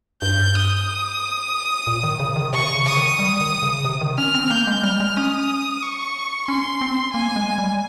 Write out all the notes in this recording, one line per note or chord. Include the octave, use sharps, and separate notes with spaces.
G2 G6
D#6
A#2
D#3
C#3
D#3
C3 C#6
C#3
D#6
D#3
G3
D#3
C#3
C3
D#3
C#4 F6
C4
A#3 G6
G#3
G3 F6
G#3
C#4 D#6
C#6
C#4 C6
C4
A#3 G#5
G#3
G3